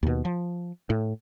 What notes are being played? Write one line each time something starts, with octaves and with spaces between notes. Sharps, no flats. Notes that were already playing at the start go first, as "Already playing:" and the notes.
D#2 B2
F3
A2